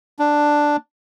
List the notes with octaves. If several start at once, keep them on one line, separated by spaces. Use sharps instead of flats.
D4